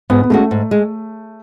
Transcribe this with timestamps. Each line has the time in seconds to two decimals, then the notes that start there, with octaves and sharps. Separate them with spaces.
0.10 G#2 B3
0.22 B3
0.30 G#3 A3 C#4 F#4
0.51 G#2
0.71 G#3